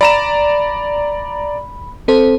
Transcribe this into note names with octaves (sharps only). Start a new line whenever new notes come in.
D5 A#5 B5 E7
C4 A4 C5